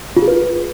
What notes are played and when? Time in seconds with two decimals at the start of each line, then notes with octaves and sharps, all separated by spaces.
0.17 F4
0.22 G#4
0.28 B4